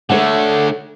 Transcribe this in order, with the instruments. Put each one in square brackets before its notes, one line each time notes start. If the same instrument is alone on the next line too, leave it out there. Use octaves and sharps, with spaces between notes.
[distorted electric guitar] D3 A3 [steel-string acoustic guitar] A4 C#5 F#5